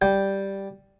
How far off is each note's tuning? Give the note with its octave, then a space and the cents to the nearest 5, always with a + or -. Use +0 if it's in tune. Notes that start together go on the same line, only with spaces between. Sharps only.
G3 +0 G5 +0